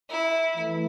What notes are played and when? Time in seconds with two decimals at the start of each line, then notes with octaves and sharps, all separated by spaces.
0.10 E4
0.56 E3 A3